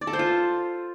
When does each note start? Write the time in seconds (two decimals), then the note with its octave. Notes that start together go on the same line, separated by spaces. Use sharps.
0.01 D5
0.07 A4
0.13 C5
0.19 F4